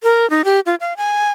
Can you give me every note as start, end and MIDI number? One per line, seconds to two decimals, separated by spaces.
0.03 0.29 70
0.30 0.42 63
0.45 0.60 67
0.66 0.75 65
0.80 0.93 77
0.97 1.31 80